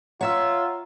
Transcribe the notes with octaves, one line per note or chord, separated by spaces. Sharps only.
F4 C#5 E5 F#5 A#5 E6